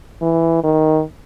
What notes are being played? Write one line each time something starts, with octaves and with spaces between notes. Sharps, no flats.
E3
D#3